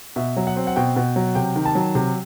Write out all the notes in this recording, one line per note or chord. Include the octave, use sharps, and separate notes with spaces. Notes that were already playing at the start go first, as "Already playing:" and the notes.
B2 E5
F#3
F#5
C4
F#5
B2 G5
B2
F#3
C3 G5
D#3
A5
F#3
C3